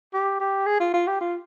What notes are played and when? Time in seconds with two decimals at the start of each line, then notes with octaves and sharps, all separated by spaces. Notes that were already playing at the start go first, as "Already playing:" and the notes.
0.14 G4
0.40 G4
0.66 G#4
0.80 F4
0.94 F4
1.08 G4
1.21 F4